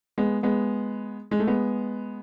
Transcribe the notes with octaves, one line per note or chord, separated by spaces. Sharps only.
G#3 B3
G#3 B3
G#3
A3
G#3 B3